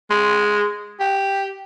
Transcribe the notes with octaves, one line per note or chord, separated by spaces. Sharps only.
G#3
G4